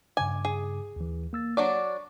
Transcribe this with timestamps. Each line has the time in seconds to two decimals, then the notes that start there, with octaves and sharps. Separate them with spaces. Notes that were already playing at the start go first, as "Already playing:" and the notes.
0.17 G2 C#3 G#5 D6
0.45 G#4
0.96 D#2 E3
1.33 A#3 E6 A6
1.57 F#3 D4 D5 C#6